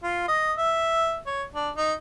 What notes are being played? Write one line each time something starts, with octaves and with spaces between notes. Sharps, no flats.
F4
D#5
E5
C#5
D4
D#4